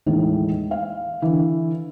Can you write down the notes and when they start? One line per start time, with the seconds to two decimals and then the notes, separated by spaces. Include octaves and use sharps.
0.06 D#2 A2 D#3 E3 G#3
0.71 F5
1.22 D3 E3